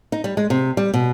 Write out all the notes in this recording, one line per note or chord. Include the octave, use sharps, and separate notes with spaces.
D#4
G3
G#3
C3
G3
B2